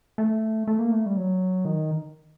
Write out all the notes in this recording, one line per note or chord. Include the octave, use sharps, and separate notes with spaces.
A3
A3
A#3
A3
G3
F#3
D#3